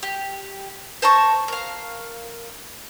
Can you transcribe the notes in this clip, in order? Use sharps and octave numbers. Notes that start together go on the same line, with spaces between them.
G4
C5 A5 A#5 C#6
A#4 F5